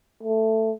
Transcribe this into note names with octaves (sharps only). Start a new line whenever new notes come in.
A3